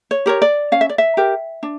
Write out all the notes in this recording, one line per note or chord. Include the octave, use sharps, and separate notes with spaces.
C#5
G4 A#4 C#5
D5
C#4 F5
E5
D5
E5
G4 A#4
D4